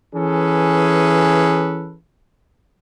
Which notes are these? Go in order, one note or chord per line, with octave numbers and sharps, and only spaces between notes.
E3 C#4 G#4 A4 B4